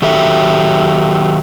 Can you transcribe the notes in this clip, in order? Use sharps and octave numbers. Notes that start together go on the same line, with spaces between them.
D#3 F#3 G4 A4 E5